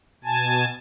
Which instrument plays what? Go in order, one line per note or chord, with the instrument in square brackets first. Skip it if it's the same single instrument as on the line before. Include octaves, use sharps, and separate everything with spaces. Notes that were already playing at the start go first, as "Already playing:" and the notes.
[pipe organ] B2 G#5 A5